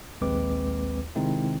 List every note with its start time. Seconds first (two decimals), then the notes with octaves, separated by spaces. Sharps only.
0.21 A#1 D#2 G#3 C4 B4 D6
1.16 C3 D#3 G#3 C4 D#4 E4